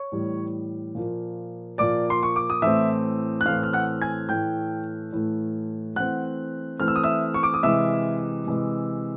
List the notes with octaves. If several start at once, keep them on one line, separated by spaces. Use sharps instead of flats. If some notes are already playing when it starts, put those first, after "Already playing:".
Already playing: C#5 C#6
A2 E3 G3
A#2 F3 A#3
A#2 F3 A#3 D5 D6
C6
C#6
D6
D#6
A2 E3 A3 C4 E5 E6
F#6
A2 E3 A3 C4 F5 F6
F6
F#5 F#6
G#5 G#6
A2 E3 A3 G5 G6
A2 E3 A3
E3 A3 C4 F#5 F#6
E3 A3 C4 F6
E6
D#6
E5 E6
C#6
D6
D#6
C3 E3 G#3 E5 E6
C3 E3 G#3